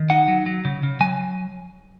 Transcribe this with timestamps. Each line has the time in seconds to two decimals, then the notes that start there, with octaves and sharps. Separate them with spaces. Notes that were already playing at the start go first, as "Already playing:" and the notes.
Already playing: D#3
0.10 D#4 F#5
0.28 F#3
0.46 F#3
0.65 C#3
0.83 C#3
1.00 F#3 G#5